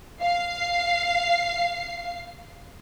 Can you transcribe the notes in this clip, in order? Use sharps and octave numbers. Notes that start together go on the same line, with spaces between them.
F5 C7